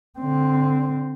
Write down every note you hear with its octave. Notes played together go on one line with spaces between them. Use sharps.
D3 C4